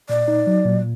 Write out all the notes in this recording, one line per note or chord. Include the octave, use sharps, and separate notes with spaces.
A#2 D5
D#4
F#3
A#2